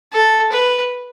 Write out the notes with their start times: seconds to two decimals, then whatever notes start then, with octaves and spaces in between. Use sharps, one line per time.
0.13 A4
0.52 B4